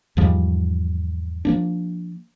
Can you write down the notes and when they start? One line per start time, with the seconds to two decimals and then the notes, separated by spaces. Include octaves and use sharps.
0.17 E2 G#2 F3 G3
1.45 F3 A#3 D4